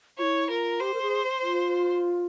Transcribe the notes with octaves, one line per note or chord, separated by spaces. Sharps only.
E4 F4 C#5
F4 A#4
G4 C5
A#4
G#4
F4